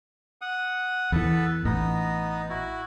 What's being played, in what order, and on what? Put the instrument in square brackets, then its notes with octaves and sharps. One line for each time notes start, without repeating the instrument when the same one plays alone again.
[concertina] F#5 D#6
[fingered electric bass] E2 E3 [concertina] B3 A4 B4
[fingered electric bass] A1 [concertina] B3 D#4 D#5
[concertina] E4 F#4